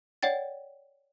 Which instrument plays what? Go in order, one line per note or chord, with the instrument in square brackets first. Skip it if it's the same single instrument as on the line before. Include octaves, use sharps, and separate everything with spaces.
[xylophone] C#5 D5 F#5 G5 A6